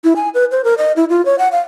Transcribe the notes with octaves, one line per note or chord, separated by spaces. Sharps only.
E4
G#5
B4
C5
A#4
D#5
E4
F4
C#5
F#5
F5